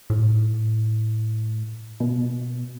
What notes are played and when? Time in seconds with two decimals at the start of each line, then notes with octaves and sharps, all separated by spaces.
0.10 A2
2.00 B2